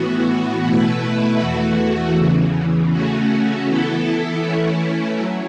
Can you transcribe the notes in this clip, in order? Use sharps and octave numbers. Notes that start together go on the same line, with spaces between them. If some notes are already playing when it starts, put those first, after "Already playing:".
Already playing: A2 E3 B3 F#4
B2 A3 E4 B4
E2 E3 A3 F#4
E2 C#3 E3
C#3 A3 C#4 F#4
E3 B3 E4 A4
E3 A3 C#4 E4
F#3